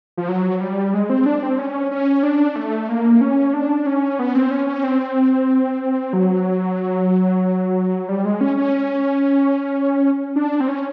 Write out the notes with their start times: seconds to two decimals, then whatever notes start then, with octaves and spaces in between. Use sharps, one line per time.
0.17 F3
0.28 F#3
0.60 G3
0.94 G#3
1.10 C4
1.26 D4
1.43 C4
1.59 C#4
1.91 C#4
2.23 D4
2.56 A3
2.89 A#3
3.21 C#4
3.54 D4
3.86 C#4
4.19 B3
4.35 C4
4.51 C#4
4.67 C#4
4.84 C4
6.13 F#3
8.09 G3
8.25 G#3
8.41 C#4
8.57 C#4
10.36 D4
10.60 C4
10.68 C#4